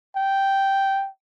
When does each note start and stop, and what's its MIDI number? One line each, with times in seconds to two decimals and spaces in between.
0.16 1.09 79